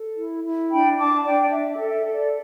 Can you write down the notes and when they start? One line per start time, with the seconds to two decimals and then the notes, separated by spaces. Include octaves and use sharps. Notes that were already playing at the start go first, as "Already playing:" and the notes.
Already playing: A4
0.15 E4
0.43 E4
0.70 D4 G5 B5
0.97 D4 A5 D6
1.24 D4 D5 G5
1.51 D4 E5
1.71 E5
1.78 A4
1.91 E5
2.06 A4
2.13 D5